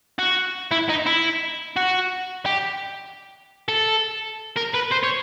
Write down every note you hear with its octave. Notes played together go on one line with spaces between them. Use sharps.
F#4
E4
D#4
E4
F#4
G4
A4
A#4
B4
C5
C#5